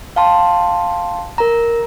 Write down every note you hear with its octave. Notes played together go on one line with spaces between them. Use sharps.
F5 G5 A5 C6
A#4 A#5